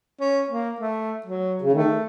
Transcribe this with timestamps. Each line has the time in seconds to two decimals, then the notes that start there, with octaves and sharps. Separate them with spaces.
0.20 C#4
0.50 A#3
0.80 A3
1.26 F#3
1.62 C#3
1.72 D#3 A3